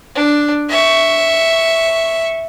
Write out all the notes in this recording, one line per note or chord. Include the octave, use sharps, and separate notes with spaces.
D4
E5 C#6